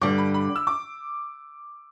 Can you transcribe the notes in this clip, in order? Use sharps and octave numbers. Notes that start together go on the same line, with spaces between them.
G2 D3 G3 D6
B5
B5
E6
D6